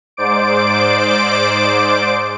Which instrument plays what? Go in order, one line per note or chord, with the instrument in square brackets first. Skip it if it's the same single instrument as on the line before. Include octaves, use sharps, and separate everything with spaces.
[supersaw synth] G#2 C5 D5 D6 D7